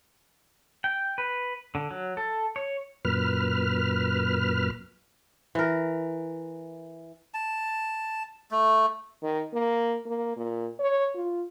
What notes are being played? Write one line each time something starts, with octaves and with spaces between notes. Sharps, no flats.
G5
B4
D3
F#3
A4
C#5
F#2 A#2 B4 F6
E3 A#4
A5
A3
D#3
A#3
A#3
A#2
C#5
F4